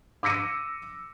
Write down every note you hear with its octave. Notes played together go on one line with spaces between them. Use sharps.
D6 E6 A#6 C#7 D#7